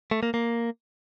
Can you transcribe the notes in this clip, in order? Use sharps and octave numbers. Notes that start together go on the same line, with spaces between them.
A3
A#3
A#3